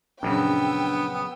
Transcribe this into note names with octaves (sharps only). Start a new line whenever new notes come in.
A#1 F#2 C#3 B3 C#4 D4 G5 E6